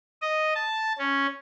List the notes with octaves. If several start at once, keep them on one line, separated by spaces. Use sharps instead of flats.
D#5
A5
C#4